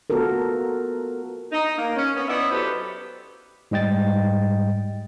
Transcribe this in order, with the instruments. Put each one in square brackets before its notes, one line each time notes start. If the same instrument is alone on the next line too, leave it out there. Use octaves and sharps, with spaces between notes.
[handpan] B3 F4 F#4 A4 A#4
[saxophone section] D#4
A#3
C#4
B3 C#4
B3 D#4 E4 D5 E5
F#3 G4 A4 B4 C5
[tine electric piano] G#2 G3 D#5 G5 A6